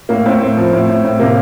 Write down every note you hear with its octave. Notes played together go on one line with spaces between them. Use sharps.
A2 A#3
A2 C4
A2 C4
F3
A2
A2
A2
C3 A#3